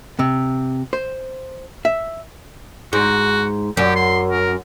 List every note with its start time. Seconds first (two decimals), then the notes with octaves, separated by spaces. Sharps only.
0.19 C3
0.93 C5
1.85 E5
2.93 G#2 F#4
3.77 F#2 G4
3.96 C6
4.31 A#4